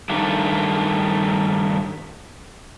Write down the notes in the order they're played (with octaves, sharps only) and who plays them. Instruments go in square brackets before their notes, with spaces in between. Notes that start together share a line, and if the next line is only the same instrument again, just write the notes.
[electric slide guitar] G2 D#3 A3 D4